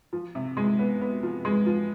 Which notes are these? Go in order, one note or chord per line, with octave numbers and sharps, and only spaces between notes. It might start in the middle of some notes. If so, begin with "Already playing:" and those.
F3
C3
G#3
B3
B3
F3
G#3
F3